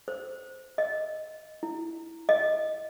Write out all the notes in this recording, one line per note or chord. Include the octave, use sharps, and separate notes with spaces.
C5
D#5
E4
D#5